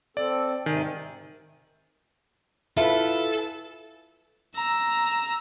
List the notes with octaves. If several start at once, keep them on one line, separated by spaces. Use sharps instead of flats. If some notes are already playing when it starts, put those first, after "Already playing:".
C4 A4 D5
G#2 C3 D#3 G#5
E4 F4 A4 B4
A#5 E6